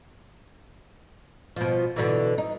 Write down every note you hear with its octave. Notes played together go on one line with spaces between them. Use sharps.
B2 F3
B2 D3 E3
D#4